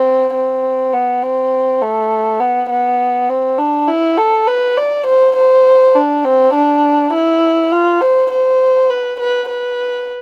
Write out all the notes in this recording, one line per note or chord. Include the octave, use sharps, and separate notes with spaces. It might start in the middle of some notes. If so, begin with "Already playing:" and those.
Already playing: C4
C4
B3
C4
A3
B3
B3
C4
D4
E4
A4
B4
D5
C5
C5
D4
C4
D4
E4
F4
C5
C5
B4
B4
B4